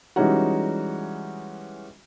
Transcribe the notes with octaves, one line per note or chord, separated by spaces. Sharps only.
E3 G3 G#3 C#4 D#4 F#4